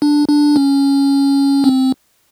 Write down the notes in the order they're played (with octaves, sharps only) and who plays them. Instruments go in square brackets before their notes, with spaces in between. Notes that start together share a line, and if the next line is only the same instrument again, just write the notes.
[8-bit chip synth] D4
D4
C#4
C4